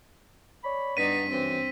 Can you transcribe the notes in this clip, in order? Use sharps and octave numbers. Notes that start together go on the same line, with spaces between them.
C#5 D5 B5
G2 B3 D#4 D5 B6 D#7
F#2 E3 C4